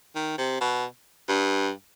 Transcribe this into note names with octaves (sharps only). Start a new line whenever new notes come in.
D#3
C3
B2
G2